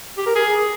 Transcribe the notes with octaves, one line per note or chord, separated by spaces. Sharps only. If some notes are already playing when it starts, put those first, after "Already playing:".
G4
A#4
G#4